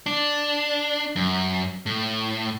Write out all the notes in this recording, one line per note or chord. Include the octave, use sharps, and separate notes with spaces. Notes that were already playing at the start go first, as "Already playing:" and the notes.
D4
F#2
A2